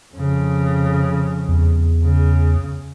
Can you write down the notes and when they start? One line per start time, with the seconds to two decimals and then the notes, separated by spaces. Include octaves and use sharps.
0.13 F2 C#3
1.49 E2
2.05 C#3